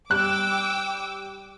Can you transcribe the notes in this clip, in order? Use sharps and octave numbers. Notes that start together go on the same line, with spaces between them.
G3 G5 D6 E6 F#6